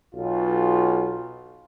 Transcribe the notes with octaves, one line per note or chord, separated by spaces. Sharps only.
B1 F4